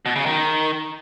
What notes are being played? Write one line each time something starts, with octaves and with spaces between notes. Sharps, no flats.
B2
C#3
D#3